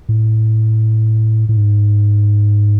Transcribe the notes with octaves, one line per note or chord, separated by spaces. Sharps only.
A2
A2
G#2